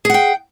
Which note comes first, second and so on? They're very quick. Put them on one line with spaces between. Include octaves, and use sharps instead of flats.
G#4 F#5 G5